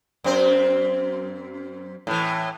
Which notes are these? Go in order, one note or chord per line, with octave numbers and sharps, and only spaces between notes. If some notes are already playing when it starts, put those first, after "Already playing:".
F#2 C4 C5
A2 E3